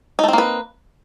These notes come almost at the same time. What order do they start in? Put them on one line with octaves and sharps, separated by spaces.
D#4 A3 C4 A#3 B4